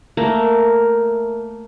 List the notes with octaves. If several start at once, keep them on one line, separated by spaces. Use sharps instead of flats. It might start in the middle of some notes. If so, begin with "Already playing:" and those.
A3 A#3 A#4